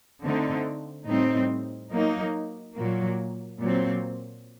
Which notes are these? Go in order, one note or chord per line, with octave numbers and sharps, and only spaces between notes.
D3 A3 C4 D#4
A2 G3 C4 D#4
F#3 A#3 D#4
A#2 F#3 A#3
A#2 F#3 C4